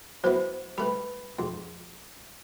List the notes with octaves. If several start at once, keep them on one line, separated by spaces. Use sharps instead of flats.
F#3 B3 E4 C5
G3 A3 B4 B5
F2 G#2